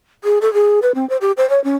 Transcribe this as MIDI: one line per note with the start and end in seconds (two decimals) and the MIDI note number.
0.24 0.39 68
0.41 0.52 69
0.53 0.80 68
0.82 0.92 71
0.95 1.08 60
1.10 1.17 72
1.21 1.32 67
1.37 1.48 72
1.50 1.62 73
1.64 1.76 61